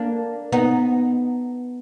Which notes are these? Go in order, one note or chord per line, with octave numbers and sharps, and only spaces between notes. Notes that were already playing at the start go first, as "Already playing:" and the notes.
Already playing: A#3 D4
B3 D#4